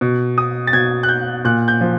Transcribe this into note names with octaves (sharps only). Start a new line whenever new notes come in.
B2
D#6
A6
B2 G#6
F#6
G6
A#2 F#6
G6
F3